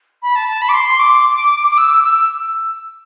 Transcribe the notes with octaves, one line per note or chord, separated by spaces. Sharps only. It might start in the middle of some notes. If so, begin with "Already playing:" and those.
B5
A5
A5
B5
D6
C6
D6
D6
E6
E6